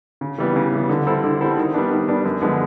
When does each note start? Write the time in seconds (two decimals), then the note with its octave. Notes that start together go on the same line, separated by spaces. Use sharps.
0.21 C#3
0.38 E3 G3 B3
0.56 C#3
0.73 E3 G3 B3
0.89 D3
1.07 G3 C4 E4 A4
1.24 D3
1.41 G3 C4 E4 A4
1.57 D#3
1.74 G3 B3 D4
1.91 D#3
2.08 G3 B3 D4
2.25 F#2
2.42 D3 F3 G#3 B3